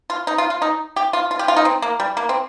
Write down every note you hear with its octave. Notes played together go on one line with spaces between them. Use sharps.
F4
D#4
F4
F4
D#4
G4
F4
F4
G4
F4
D#4
C4
A#3
G3
A#3
C4